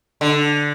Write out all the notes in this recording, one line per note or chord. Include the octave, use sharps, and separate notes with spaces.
D3